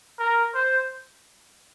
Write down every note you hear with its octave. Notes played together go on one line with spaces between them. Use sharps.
A#4
C5